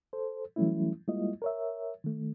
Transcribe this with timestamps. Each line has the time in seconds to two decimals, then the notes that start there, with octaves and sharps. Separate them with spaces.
0.13 A4 C5
0.56 E3 F#3 G3 A3 C#4 E4
1.08 G3 G#3 A#3 E4 F4 D#5
1.42 A#4 C#5 E5
2.04 D#3 A3